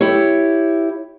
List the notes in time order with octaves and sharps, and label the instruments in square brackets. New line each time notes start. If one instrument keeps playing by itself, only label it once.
[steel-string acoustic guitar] E4 G4 C#5